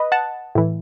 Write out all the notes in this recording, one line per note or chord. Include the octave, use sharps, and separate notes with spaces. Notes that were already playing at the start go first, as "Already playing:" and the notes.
Already playing: B4 D#5
F#5 A5
A2 E3